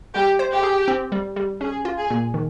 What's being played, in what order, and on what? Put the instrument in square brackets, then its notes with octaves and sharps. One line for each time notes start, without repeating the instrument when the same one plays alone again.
[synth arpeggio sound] G3 [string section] G4
[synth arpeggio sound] C5
[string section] G4
[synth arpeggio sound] G#4
C4
G3
G3
[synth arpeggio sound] C#4 [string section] G#4
[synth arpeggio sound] F4
[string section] G#4
[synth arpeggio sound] A#2
D#3